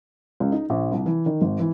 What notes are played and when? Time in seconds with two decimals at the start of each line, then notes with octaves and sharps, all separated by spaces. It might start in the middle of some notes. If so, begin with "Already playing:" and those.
0.40 C#2
0.52 D#4
0.70 A#1
0.92 C2
1.06 E3
1.26 D#3
1.42 G#1
1.59 E3